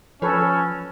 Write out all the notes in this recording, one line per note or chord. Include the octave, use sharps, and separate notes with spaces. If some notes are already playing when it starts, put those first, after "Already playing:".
F3 C#4 A4 B4 C#5